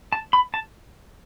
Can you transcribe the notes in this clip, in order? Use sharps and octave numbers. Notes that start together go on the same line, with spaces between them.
A5
B5
A5